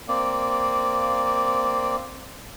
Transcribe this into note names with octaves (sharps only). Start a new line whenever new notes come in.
A#3 C4 D5